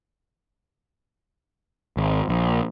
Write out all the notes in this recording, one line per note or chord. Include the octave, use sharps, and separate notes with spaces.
G#1
A#1